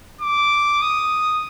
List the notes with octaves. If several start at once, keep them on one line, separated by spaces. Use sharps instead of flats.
D6
D#6